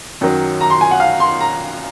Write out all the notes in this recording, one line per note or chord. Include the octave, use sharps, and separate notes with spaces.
F#2 D#3 F#3
A#5
C6
G#5
F#5
F5
C6
A#5